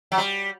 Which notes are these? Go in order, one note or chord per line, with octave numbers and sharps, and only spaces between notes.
F#3
G3